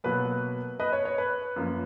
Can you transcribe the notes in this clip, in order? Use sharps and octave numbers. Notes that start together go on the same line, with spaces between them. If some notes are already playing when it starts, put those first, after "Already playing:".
B2 F#3 A#3 B4
B4 D#5
C#5
C#5
B4
F#2 F3 A#3